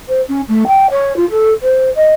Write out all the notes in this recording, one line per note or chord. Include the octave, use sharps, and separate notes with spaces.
C5
C#4
A3
G5
C#5
F4
A4
C5
D#5